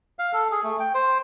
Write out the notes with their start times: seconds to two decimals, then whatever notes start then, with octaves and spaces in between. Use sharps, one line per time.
0.19 F5
0.33 A4
0.51 G#4
0.64 A3
0.80 G5
0.94 C5